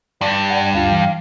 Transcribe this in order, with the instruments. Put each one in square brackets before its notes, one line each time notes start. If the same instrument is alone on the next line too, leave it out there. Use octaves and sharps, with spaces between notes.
[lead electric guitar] G2 [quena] D5
[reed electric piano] F#5 G5
[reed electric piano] D2 D4 F4 [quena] F5
[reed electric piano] E3